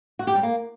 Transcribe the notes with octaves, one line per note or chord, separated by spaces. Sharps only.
F#4
G4
G3
A#3